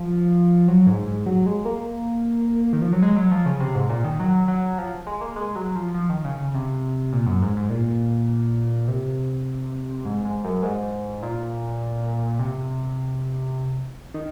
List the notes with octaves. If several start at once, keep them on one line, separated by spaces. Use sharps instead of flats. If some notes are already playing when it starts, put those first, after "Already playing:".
Already playing: F3
F#3
G#2
G#2
F#3
G#3
A#3
D#3
F3
F#3
G#3
F#3
F3
C#3
C3
G#2
A#2
D#3
F#3
F#3
F3
G#3
A#3
G#3
F#3
F3
F3
D#3
C#3
C#3
C3
A#2
F#2
G#2
G#2
A#2
C3
G#2
G#2
F#2
G#2
A#2
C3
D#3